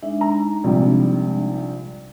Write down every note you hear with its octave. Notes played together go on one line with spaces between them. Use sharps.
G#3 D4 D#4 E5
A#5
A#1 C3 G3